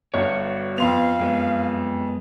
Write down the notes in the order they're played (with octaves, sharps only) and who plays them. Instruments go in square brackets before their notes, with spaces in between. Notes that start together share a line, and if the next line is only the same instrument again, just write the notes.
[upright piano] G1 G2 [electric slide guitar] F#4 C#5
[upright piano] F2 C6 F7 [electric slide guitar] B3 [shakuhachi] F5
[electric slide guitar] F#2 G#3 B3